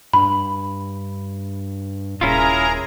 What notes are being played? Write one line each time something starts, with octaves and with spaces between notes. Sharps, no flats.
G2 B5
D#1 C#4 E4 F4 G#4 A#4 A#5